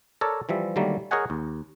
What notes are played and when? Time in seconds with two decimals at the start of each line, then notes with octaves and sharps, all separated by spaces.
0.21 A4 A#4 C#5 D5
0.49 E3 F3 G3 E5
0.76 D3 D#3 F#3 G3 A3 A#3
1.11 G#4 A#4 C#5 D#5 F#5 G#5
1.30 D#2